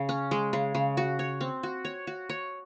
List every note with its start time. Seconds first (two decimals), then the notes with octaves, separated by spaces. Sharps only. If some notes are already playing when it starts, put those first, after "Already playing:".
Already playing: C#3
0.09 C#4
0.31 G#3
0.53 C#3
0.75 C#3
0.97 F#4
1.19 C#5
1.41 C4
1.63 F#4
1.85 C#5
2.07 F#4
2.29 C#5